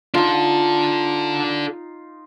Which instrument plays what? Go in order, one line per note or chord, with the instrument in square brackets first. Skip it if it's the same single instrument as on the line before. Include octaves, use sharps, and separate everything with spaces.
[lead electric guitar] D4 A4 [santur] D#4 F4